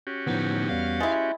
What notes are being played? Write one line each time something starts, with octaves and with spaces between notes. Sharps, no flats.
C#4 F#4 G4
D2 A2 F3 B3 D#4
E2 G3 B3 F5
G#3 E4 A6